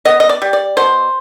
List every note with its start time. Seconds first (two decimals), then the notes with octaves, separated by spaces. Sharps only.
0.05 B3 D#5
0.20 D#5
0.29 D5
0.42 G3
0.53 D5
0.77 B2 C5